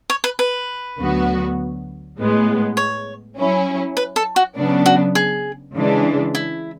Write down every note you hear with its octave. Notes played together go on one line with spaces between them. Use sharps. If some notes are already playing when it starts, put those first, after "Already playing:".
C#5
B4
B4
D2 D3 F#3 B3 F#4
A2 G#3 B3
C#5
F#3 C#4 E4
B4
A4
F#4
C#3 F#3 B3 D4
F#4
G#4
C#3 E3 G#3 D4
E4